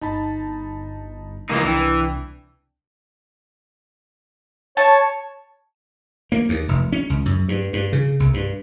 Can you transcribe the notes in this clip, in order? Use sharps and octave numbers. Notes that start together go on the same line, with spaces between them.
G1 D#4 A5 B5
C#2 E3 F3 A#3 D#4
C2 E3 D4 G5
C#5 A5
A#3
D#2
F1
C#4
C#2
F#2
G2
G2
C#3
C2
G2